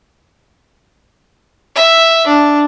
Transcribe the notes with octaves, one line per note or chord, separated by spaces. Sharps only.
E5
D4